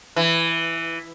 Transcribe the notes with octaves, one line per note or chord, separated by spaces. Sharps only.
E3